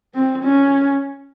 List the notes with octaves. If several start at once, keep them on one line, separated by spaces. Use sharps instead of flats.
C4
C#4